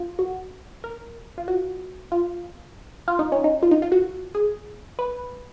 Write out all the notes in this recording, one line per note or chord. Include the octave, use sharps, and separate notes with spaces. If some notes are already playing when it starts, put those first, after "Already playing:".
Already playing: F4
F#4
A#4
F4
F#4
F4
F4
D#4
C#4
D#4
F4
D#4
F4
F#4
G#4
B4